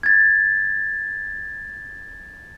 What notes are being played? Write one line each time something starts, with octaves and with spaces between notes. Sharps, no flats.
G#6 A6